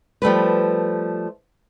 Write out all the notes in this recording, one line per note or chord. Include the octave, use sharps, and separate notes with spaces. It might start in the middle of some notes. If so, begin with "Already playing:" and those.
F3 G3 A3 B4